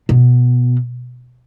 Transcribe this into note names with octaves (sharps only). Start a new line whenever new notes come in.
B2